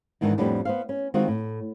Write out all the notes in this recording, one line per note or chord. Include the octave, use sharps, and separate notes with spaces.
E2 G#2 D#3 E3 D4 D#4
F2 A2 G3 B3 D4
B3 C5 F5
C#4
D#3 G#3 C4 D#4 F4 F#4
A2